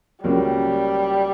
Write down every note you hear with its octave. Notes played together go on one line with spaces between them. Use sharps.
C#2 C#3 F#3 G3 A#3